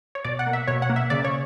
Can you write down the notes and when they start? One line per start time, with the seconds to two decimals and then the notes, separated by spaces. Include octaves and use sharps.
0.15 C#5
0.24 B2 D5
0.39 F#5
0.47 A#3
0.53 E5
0.67 B2 C#5
0.82 F#5
0.90 A#3
0.96 E5
1.10 C#3 D5
1.24 C#5